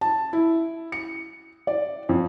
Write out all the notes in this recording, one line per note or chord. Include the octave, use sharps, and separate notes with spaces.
A5
E4
C#7
D5
F2